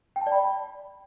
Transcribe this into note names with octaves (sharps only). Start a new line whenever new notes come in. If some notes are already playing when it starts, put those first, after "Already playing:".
G5
A5
D5
B5